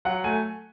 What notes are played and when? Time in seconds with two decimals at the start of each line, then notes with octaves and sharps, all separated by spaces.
0.05 F#3 F#5
0.24 A3 G#5